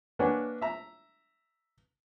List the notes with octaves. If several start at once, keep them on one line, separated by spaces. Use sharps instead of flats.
A#3 D4 B4 C#5 F#5 G#5
E5 A#5